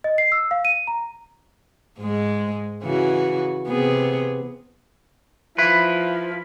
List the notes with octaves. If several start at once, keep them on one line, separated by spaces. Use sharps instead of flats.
D#5
C7
E6
F5
D#7
A#5
G#2 G#3
C#3 E3 F#4
C3 B3 G#4
F3 E4 B4